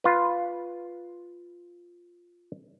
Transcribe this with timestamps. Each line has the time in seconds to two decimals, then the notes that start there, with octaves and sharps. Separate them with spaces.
0.04 F4 B4